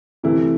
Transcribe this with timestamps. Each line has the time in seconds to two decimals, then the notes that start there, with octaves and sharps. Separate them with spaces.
0.23 C3 E3 A3 E4